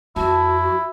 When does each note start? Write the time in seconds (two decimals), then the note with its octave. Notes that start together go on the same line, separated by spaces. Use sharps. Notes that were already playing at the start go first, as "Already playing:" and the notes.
0.16 F2 E4 F#4 A5